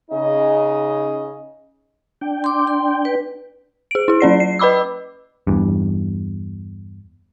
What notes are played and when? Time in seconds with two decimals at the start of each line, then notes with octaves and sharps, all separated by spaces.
0.11 C#3 D#4 D#5
2.21 D4 G5
2.44 C6 D6
2.67 C6
3.05 B4
3.91 G#4 D7
4.08 E4 G#4
4.20 F#3 C#4 D5 C7
4.40 C7
4.59 B4 D#5 B5 D6 E6
5.47 E2 G2